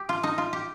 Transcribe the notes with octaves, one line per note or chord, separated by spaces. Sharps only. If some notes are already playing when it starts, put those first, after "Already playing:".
Already playing: G4
F4
D#4
F4
G4